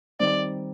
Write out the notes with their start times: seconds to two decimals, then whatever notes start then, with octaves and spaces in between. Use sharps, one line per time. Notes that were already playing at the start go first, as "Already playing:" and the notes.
0.20 D#3 G3 C4 D#4 D5